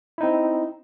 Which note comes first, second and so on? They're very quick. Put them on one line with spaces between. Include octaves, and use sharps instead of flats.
E4 D#4 C4